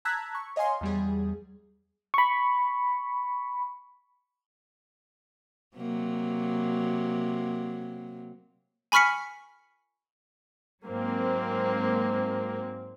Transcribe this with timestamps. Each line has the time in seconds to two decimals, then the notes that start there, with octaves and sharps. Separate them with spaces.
0.05 A5 A#5 E6 F#6 G#6 B6
0.35 C#6
0.56 C#5 D#5 F5 G#5 C6
0.81 E2 G3 G#4
2.14 B5 C#6
5.77 C3 F#3 A#3
8.92 G#5 B5 C#6 F6 B6 C#7
10.85 G#2 F#3 A#3 C4